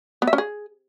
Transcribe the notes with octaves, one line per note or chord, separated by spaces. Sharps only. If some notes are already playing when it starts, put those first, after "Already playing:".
B3
E5
C#4
G#4